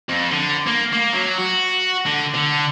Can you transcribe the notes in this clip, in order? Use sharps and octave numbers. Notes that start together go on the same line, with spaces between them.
F2
D3
A#3
A#3
F#3
F#4
D3
D3